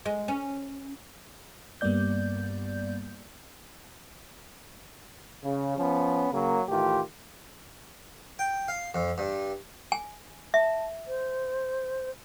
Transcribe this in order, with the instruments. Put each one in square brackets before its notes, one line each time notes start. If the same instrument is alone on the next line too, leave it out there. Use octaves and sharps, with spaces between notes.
[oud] G#3
C#4
[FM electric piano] G2 G3 A#3 B3 D5 G6
[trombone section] C#3
F3 B3 C#4
C#3 F#3 A#3
A2 D#3 E3 F4 G4
[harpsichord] G5
F5
F2
G2
[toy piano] G#5
[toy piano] E5 [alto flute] A5
[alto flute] C5